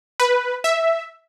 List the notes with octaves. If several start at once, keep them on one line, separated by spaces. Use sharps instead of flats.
B4
E5